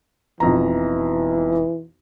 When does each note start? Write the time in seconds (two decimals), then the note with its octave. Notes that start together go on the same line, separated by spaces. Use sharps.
0.40 E1 B1 F2 E3 A#5